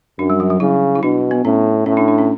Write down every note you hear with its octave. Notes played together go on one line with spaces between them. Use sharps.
F#2 D4
G3
F#3
F#3
C#3 E4
E4
B2 D4
B3
A2 C#4
A2 C#4
D4
D4
C#4